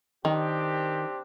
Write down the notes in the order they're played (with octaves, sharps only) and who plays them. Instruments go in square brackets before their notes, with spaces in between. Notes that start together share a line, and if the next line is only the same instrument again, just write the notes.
[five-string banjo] D#3 [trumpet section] C4 D4 G4